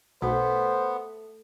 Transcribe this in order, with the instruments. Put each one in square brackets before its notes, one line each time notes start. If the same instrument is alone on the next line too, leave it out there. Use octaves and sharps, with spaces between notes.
[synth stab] B1 [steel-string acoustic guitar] A3 [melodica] B3 [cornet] C5